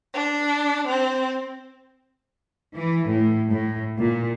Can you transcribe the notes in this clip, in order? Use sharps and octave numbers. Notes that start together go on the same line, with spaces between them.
D4
C4
E3
A2
A2
A#2